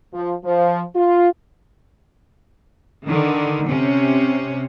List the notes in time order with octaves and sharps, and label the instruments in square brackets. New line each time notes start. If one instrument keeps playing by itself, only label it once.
[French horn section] F3
F3
F4
[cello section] D3 D#3
C3 C#4